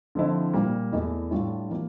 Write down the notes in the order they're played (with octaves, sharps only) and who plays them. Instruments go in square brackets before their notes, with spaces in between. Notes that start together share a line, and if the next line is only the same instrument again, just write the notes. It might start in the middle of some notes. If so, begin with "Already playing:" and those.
[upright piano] D3 F3 C4 E4
A#2 G3 A#3
E2 E3 A3 E4
A2 G3 D4 F4
E3 A#3